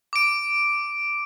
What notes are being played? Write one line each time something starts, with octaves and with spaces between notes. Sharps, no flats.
D6 D7